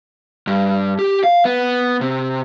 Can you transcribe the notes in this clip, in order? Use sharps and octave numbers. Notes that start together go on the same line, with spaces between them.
G2
G4
F5
B3
C3